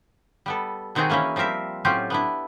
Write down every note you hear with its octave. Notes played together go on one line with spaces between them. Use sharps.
G3 B3 A4
B2 D#3 C4 D#4 F#4 G#4
E3 A#3 C#4 D#4 E4
F3 G3 C4 A#4 E5
A2 F#3 C4 C#4 F4 G4
B3 D4 E4